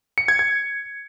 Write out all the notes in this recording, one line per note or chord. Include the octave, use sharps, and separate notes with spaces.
C#7
G#6
G#6